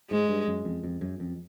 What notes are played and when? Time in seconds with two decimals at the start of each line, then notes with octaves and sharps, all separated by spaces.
0.11 G#2 G#3
0.29 G2
0.48 F#2
0.65 F2
0.84 F2
1.01 F#2
1.20 F2